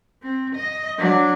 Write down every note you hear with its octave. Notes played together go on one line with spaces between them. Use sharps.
C4
D#5
F#3 D4